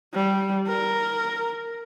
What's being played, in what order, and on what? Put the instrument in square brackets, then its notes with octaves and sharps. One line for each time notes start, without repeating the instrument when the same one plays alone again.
[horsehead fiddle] G3
A#4